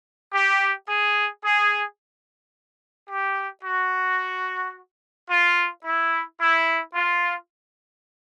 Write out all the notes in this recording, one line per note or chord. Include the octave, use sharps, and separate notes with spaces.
G4
G#4
G#4
G4
F#4
F4
E4
E4
F4